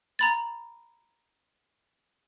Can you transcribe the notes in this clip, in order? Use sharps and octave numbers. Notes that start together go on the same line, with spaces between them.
A#5 B5 A6